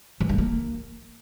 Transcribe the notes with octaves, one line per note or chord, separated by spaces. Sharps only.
E3
G2
A#3